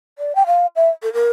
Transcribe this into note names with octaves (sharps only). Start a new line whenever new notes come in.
D5
G5
F5
E5
A4
A#4